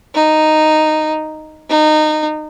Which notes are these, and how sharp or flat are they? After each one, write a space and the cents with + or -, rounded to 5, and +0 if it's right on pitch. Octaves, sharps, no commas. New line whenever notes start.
D#4 -5
D#4 -20